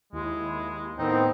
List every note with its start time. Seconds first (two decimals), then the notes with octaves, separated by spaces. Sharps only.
0.13 D#2 G#3 E4
0.98 A2 D#3 B3 C4 D#4